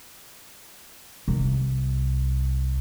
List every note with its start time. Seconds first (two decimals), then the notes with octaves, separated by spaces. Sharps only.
1.28 C2